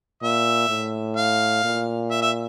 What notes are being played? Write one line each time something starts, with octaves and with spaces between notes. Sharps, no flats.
A#2 E5
A2
F5
A#2
E5
E5